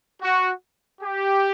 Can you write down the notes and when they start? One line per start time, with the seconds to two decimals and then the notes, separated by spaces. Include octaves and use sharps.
0.21 F#4
1.01 G4